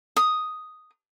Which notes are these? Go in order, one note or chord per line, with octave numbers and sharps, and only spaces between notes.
D#6